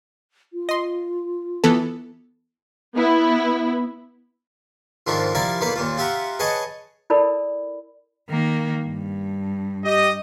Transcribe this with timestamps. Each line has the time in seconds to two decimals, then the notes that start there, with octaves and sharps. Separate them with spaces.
0.53 F4
0.69 D#5 C6
1.64 E3 B3 A4
2.95 B3 E4
5.07 F2 G#2 D#3 F3 C4 D4
5.35 F3 G3 E4 A#4 D5 F5
5.61 B1 E2 A#3 B3 F5 B5
5.76 D#2 A#2 F4
5.98 F4 G4 E5 F#5 A#5
6.39 G#4 B4 C#5 D#5 F#5 A5
7.10 E4 A4 A#4 D5 B5
8.29 D#3 A#3
8.84 G2
9.85 G4 D#5